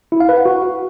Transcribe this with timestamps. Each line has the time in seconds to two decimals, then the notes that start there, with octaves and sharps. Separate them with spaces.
0.12 E4
0.20 F5
0.29 B4
0.37 F#5
0.45 F#4